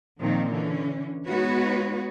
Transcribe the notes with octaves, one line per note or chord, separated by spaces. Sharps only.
A#2 D#3 F3 C4 D#4
D3 E3 C#4
G#3 B3 D#4 F#4 B4 C#5